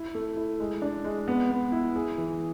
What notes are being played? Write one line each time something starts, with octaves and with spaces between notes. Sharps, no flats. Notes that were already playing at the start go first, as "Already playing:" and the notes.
Already playing: E4
A3
E4
G#3
D4
G#3
B3
B3
E4
G#4
E3